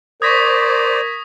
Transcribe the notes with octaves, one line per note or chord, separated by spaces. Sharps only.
A#4 C5 D5 C#6 D#6 G#6 A#6 B6